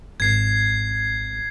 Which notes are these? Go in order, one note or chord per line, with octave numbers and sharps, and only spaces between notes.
G#1 G#6 C7